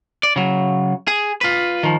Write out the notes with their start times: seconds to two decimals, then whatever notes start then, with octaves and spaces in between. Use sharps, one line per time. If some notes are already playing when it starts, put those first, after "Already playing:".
0.23 D5
0.36 C#3 F#3
1.08 G#4
1.41 F4 B4
1.83 D#3 F3